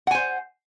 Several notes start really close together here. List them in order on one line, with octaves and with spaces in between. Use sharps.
F#5 G#5 C5